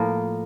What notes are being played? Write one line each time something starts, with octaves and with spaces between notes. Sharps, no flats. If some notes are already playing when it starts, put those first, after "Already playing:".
Already playing: A2 F3 A#3